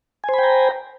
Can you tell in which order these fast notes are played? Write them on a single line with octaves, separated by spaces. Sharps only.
G#5 C5 B5 G5 A#5